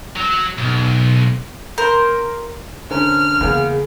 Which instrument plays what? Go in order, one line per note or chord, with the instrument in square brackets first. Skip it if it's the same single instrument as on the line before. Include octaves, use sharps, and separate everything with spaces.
[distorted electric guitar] F#3
B1
[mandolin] A#4 C5
[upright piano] D3 C#4 A#4 [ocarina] C5 [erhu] F6
[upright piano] E2 A#3 [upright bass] C#3 [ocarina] G#4